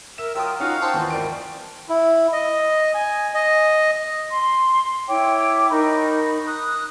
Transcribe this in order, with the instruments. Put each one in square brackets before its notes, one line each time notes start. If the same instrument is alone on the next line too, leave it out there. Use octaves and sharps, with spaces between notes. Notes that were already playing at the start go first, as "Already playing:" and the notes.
[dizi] A#4 [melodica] E5 [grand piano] E7
[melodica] F#3 F4 [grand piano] A#4 [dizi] G5 [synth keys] D#6 E6
[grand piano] C#4 F4 [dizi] D#4 [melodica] F#4 F5 F#5
[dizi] C5 [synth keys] G5 A5 C6
[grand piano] D#2 E3 [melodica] B3
[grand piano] G#1 D5 D7 [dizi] A#4
[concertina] E4
D#5
G#5
D#5
[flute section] C6
E4 C#5 G5 D6
D#4 A#4 B5 C#6
D#6 F#6